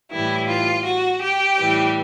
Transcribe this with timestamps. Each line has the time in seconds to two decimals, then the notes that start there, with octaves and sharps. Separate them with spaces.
0.12 A2 E3 G3 E4
0.48 F4
0.85 F#4
1.22 G4
1.57 A2 E3 G3